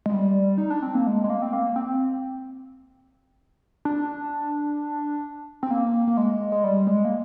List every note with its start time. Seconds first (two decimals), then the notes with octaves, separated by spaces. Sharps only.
0.06 G#3
0.14 G3
0.58 D#4
0.70 D4
0.82 C4
0.95 A#3
1.07 G#3
1.24 G#3
1.30 A#3
1.42 C4
1.53 A#3
1.76 C4
3.85 D4
5.63 C4
5.71 A#3
6.07 A#3
6.17 G#3
6.52 G#3
6.64 G3
6.87 G#3
7.05 A#3